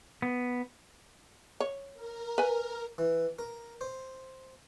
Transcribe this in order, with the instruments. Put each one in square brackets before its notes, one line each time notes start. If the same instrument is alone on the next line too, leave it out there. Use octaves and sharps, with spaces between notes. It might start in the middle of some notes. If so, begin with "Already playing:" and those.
[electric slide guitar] B3
[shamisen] C#5
[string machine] A#4
[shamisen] B4 G#5
[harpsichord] E3
A#4
C5